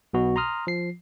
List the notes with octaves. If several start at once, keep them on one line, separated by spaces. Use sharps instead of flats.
B1 B2 F#4
A#5 C6 D#6 F6
F3 C7